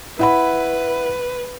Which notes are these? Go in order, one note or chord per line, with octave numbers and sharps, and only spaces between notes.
E4 B4 F#5 B5